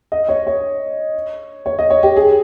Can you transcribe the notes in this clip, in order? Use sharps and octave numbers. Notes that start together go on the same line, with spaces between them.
D#5
C#5
C#5
C#5
D#5
C#5
G4
G#4